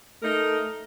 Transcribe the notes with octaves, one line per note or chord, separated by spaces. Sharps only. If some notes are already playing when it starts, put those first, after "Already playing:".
A3 D#4 A#4